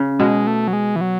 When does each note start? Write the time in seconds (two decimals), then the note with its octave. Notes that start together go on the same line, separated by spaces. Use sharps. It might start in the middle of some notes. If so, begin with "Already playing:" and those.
Already playing: C#3
0.19 B2 G#3
0.47 A3
0.68 F#3
0.73 G#3
0.96 E3
1.01 F#3